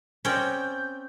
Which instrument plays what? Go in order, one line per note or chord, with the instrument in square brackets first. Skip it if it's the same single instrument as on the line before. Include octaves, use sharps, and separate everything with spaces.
[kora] C4 D5 D#5 [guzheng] C#4 G5 [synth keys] G6